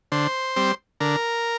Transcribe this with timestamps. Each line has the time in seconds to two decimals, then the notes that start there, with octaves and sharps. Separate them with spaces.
0.12 D3 C5
0.56 G3 C4
1.00 D3 A#4